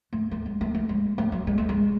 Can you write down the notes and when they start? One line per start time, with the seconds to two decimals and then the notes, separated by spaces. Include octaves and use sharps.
0.13 A3
0.31 A3
0.46 G#3
0.61 A3
0.75 A3
0.89 G#3
1.18 A3
1.32 F#3
1.47 G#3
1.58 A3
1.69 G#3